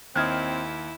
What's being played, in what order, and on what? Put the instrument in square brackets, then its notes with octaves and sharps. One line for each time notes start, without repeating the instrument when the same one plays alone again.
[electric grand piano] D#2 G#6 [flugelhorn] C4 [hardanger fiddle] E4 [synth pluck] D#5 F6